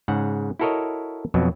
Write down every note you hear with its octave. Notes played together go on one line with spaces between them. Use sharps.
G#2 C#3 F#5
E4 F#4 A4 A#4 C#5 D#5
F2 B2 F#3